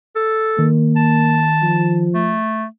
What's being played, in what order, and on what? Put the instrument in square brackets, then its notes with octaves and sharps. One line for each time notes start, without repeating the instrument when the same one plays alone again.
[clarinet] A4
[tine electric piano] D#3 [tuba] A#3
[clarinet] A5
[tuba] F3
[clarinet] A3